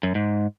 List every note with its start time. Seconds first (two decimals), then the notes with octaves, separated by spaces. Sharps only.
0.03 F#2
0.15 G#2